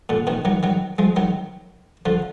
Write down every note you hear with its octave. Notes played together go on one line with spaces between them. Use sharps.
A#2 D3
B2 D#3
D#3 F#3
D#3 F#3
F3 G#3
D#3 F#3
D3 F3